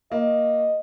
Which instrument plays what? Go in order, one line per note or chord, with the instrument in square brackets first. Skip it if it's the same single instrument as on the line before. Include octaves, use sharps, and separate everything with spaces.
[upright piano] A#3 [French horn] D#5